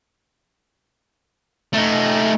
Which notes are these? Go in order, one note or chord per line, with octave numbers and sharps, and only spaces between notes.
A3 D#4